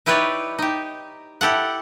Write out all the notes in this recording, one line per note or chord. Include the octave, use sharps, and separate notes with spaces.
D#4 E4 G4 B4 C#5 D5
D#4 G4
E4 G4 A4 F#5